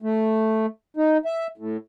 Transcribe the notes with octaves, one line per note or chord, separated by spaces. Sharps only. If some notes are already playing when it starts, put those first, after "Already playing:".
A3
D#4
E5
A2